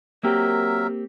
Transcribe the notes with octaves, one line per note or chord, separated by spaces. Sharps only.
F#3 A#3 C4 G4 A#4 E5